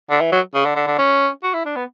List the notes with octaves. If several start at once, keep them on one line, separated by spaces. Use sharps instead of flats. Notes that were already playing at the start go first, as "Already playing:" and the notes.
D3
E3
F#3
C#3
D3
D3
D3
C#4
F#4
E4
D4
B3